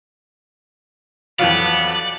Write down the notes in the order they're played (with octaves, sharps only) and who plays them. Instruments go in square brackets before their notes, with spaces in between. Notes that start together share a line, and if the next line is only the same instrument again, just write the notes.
[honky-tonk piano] F2 E3 F#3 [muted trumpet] B3 [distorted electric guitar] D5 [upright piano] F5